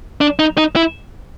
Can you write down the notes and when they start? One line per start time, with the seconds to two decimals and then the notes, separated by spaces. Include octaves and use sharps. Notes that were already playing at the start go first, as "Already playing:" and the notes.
0.21 D4
0.39 D#4
0.57 D#4
0.76 E4